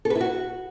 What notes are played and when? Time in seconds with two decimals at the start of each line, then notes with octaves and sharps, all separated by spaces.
0.05 A4
0.10 B4
0.15 E4
0.20 F#4